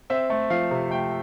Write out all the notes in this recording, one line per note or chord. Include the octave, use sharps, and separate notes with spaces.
C4 E5
A3
F3 F5
C3
A3 G5